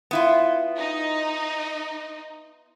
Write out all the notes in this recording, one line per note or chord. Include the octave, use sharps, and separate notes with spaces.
B3 E4 F4
D#4